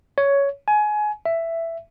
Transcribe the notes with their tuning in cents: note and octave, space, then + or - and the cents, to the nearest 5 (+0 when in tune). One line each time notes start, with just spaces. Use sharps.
C#5 +10
G#5 +25
E5 +10